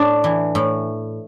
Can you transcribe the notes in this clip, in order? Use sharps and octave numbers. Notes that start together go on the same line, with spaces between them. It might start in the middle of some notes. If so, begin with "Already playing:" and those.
Already playing: A2 D4
E3
A2